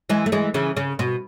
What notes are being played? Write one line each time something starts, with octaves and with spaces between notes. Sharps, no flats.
E3 G#3
A3
E3 G#3
C#3 E3
C#3
B2